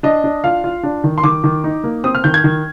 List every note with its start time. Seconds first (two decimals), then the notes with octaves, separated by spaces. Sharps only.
0.03 D4 D#5
0.24 D4
0.44 F4 F5
0.64 F4
0.83 D4
1.04 D#3
1.18 C6
1.24 D#3 D6
1.44 D#3
1.64 D#4
1.84 A#3
2.04 C4 D#6
2.15 F6
2.24 D#3 G6
2.34 G#6
2.44 D#3